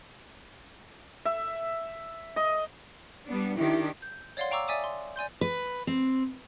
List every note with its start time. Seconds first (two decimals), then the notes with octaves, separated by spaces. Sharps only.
1.25 E5
2.36 D#5
3.27 G3 B3 D4
3.57 D#3 D4 E4 G4
4.02 G6
4.37 C#5 D5 F5 F#5 C6
4.51 F5 G5 A#5 C#6 D6 E6
4.68 D5 E5 G#5 D6 D#6
4.84 C6
5.16 D5 G#5 C6 G6
5.41 B4
5.87 C4